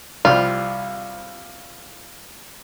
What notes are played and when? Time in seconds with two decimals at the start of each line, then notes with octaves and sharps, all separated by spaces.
0.25 C2 F3 G3 F4